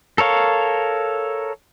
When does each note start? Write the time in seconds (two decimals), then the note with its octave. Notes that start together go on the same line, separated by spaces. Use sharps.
0.18 A4 A#4 C#5 F5